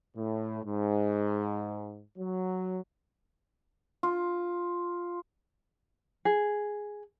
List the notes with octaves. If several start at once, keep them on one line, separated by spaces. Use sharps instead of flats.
A2
G#2
F#3
F4
G#4